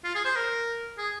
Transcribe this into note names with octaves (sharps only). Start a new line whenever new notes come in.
F4
G#4
C5
A#4
G#4